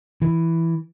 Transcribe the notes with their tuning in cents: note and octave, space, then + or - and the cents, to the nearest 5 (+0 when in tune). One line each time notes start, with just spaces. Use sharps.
E3 +0